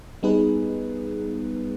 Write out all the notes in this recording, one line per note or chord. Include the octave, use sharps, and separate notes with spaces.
G3 B3 D#4 G#4 B4